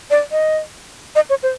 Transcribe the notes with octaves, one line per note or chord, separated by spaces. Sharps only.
D5
D#5
D#5
C#5
C5